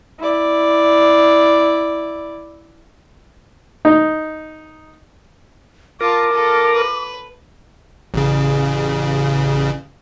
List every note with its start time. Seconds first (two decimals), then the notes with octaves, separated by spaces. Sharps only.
0.20 E4 D5
3.85 D#4
6.01 F4 A#4 A5 D6
6.33 F4 A4
6.74 B4
8.14 A1 C#3